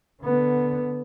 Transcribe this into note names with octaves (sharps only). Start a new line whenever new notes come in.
D3 B3